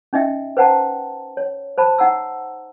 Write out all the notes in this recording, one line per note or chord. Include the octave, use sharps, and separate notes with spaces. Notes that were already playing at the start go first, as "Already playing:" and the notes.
C#4 D#4 D#5 E5 G5
B4 C5 F#5 G5 A5 A#5
C#5
C5 A5 B5
D#4 F#5 A#5 E6